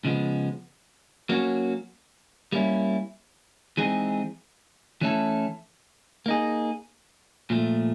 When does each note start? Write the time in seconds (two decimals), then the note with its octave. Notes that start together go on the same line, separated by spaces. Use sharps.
0.05 C#3 F3 G#3 B3
1.29 F#3 A#3 C#4 F#4
2.52 G3 A#3 C#4 E4
3.77 E3 G#3 C4 D#4 G#4
5.01 E3 A3 C#4 E4 A4
6.26 A#3 D#4 G#4
7.50 A#2 F3 A3